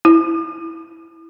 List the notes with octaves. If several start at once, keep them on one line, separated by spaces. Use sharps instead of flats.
E4